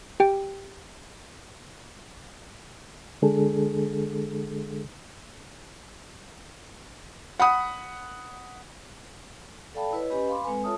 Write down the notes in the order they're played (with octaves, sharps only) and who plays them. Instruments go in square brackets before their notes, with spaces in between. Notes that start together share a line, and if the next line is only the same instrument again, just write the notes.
[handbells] G4 G5
[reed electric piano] D3 G#3 D4 G#4 A4
[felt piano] F#5 B5 D#6
[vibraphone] A4 D5 F5 G5 A5 B5
E4 B4 C#5 D#5
C#4 G4 B4 D#5 G#5 B5
F5 B5 C6 D6
G#3 C4 A4 B4 G#5
F4 A4 C#5 E5 A5 D#6